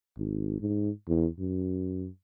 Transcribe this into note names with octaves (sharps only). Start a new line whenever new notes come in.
G#1
G#2
E2
F#2